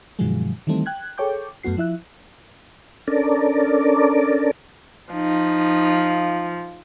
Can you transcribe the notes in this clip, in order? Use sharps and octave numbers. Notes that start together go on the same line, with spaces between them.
G2 B2 D#3 F3 F#3 G#3
D#3 E3 G3 A3 C4
G5 F#6 G#6
G#4 A4 C#5 G5 D6 G6
F#2 A3 B3 F#4 C7
F3 E4 E5 F#6
C#4 D4 A4 A#4 D5
F3 D#4